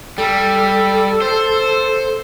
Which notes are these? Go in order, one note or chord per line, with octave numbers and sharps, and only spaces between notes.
G3 A4
C5